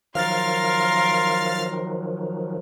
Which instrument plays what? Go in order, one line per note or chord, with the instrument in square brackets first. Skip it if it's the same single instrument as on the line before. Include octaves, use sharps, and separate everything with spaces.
[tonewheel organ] D#3 F3 F#3 [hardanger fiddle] A#4 C6 [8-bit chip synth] F5 F6 A6